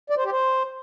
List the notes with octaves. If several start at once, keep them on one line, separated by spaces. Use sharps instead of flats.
D5
C5
G4
C5